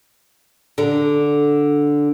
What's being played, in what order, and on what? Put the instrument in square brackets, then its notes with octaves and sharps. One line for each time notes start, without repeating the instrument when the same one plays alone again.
[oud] D3